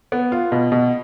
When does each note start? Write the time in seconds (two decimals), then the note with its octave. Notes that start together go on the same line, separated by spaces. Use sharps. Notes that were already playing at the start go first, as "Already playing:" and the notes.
0.12 B3
0.32 F4
0.52 B2
0.72 B2